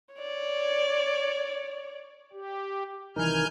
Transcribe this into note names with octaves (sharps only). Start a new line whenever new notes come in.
C#5 D5
G4
C2 D#3 E3 D#4 A#4 G#5 F6 G6